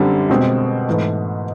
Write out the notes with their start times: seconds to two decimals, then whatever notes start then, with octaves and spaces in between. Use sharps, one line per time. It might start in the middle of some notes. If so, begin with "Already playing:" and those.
Already playing: F#2 D3 G3 C4
0.29 B2 G#3 C4
0.87 G#2 E3 A3